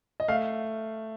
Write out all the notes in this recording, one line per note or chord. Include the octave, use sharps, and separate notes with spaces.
D#5
A3 F5